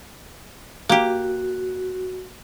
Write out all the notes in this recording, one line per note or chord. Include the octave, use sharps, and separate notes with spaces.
A#3 F#4 G4